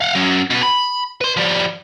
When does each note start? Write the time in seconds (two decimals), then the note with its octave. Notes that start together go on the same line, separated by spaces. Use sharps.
0.01 F5 F#5
0.15 F#3 C#4
0.50 B2 B4
0.63 B5
1.21 B4 C6
1.37 F3 G3